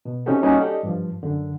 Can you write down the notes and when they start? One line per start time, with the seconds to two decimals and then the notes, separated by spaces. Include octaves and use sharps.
0.05 B2
0.26 C3 C#4 D#4 F#4 G4 A4
0.43 G3 A#3 C#4 D#4 E4 F#4
0.60 G4 A4 D5 D#5
0.83 G2 F3
1.23 F#2 D3